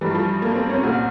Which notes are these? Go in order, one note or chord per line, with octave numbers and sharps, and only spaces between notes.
G2 E3 G3
F3
A#3
C4
C#4
C2 A#2 C4